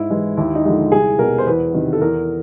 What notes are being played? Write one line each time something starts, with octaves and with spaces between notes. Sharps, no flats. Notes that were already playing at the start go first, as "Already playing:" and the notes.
Already playing: G#2 E4
E3 G#3
D#2 E4
D#4
D3 F3 G#3 E4
C2 G#4
B2 G3 A#4
C5
E2 B4
C3 D#3
A4
E2 A#4